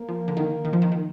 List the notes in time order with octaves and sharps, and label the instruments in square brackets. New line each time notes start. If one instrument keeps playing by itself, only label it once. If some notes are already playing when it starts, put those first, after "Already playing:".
Already playing: [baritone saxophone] A#3
[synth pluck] F3
D3
D#3
D#3
F3
D#3
D#3